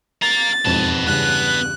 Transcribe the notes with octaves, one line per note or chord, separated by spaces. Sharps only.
F5 A#5 A6
E1 F2 G#2 B3 A5
E2 G2 C#3 F#6